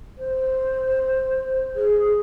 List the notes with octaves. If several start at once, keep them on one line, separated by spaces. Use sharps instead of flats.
C5
G#4